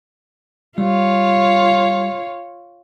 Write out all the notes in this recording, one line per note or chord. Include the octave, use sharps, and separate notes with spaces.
G3 F4 C#5